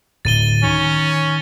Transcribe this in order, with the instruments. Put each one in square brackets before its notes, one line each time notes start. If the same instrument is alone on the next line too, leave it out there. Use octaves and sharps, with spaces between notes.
[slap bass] D1 [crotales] A6 D#7 G7
[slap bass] D#3 [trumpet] C#4